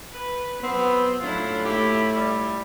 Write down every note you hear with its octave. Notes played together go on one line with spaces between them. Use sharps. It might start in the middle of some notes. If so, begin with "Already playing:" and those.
B4
F#3 B3 C4
A2 F#3 D4 E4 F4
A3 E4 F4 G4
G3